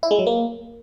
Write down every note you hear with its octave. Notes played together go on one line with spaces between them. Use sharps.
E4
G#3
F#3
A#3